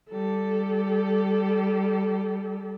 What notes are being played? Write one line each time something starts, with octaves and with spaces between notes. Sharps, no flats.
G3 A4